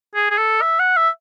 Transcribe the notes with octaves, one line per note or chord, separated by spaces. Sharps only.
G#4
G#4
A4
E5
F#5
E5